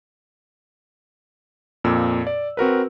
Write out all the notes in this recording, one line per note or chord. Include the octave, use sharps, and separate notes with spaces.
F2 A#2 E6
D5
C4 F#4 A#4 B4